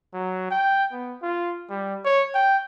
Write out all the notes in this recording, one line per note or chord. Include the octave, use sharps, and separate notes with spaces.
F#3
G5
B3
F4
G3
C#5
G5